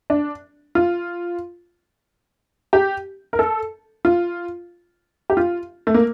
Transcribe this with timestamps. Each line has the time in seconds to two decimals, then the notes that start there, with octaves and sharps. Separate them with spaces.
0.10 D4
0.75 F4
2.73 G4
3.33 A#4
3.39 A4
4.05 F4
5.30 G4
5.37 F4
5.87 A3
5.94 A#3